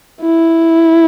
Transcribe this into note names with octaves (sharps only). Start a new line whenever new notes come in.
E4